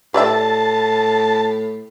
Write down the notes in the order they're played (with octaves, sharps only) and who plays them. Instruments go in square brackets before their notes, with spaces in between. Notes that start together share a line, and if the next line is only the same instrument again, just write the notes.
[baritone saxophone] A2 [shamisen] G4 D5 E5 [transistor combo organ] A5